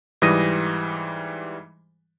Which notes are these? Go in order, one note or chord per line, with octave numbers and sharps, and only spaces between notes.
G#2 E3 G3 D#6 A#6 D#7